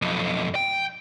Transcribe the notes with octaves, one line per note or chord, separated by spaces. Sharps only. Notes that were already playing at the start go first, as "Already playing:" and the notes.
B1 F2
G5